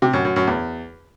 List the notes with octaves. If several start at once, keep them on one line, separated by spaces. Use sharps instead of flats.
C3
F#2
F#2
F#2
E2